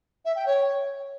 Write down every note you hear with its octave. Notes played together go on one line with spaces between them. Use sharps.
E5
G5
C#5